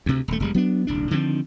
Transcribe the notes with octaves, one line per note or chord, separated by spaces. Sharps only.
D2 C3
D#1 A3
E1 G3 G#3
F#3 B3 D4
D#1 C2 D4
D3 D#3 F3 C4